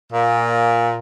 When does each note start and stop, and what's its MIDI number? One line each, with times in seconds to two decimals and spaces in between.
0.11 0.99 46